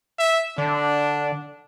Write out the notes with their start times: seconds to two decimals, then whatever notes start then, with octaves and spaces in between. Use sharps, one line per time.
0.19 E5
0.58 D3 D4